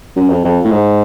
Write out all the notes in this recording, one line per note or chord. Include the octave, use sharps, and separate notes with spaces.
F#2
F2
F2
A2
G#2